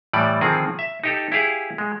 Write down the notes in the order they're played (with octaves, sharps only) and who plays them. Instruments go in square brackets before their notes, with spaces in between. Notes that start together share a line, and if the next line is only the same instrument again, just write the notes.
[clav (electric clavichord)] A2 E3 G3 D5
D3 D#3 F3 C4 G#4
E5
D#4 G4 A4
E4 G4 G#4 F5
G#3